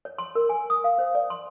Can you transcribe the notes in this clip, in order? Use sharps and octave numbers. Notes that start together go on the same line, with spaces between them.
C#5
C6
A#4
G#5
D#6
F5
C5
D5
C6